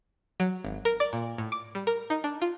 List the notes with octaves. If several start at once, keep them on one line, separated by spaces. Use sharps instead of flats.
F#3
G#1
A#4
D5
A#2
A2
D6
G3
A#4
D#4
D4
F4